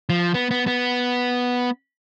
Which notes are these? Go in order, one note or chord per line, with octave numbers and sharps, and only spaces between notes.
F3
B3
B3
B3